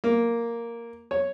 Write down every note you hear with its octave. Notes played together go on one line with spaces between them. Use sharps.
A#3
C#5